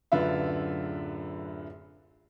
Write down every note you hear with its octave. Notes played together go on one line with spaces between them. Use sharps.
D1 F#2 D3 F4 B4 E5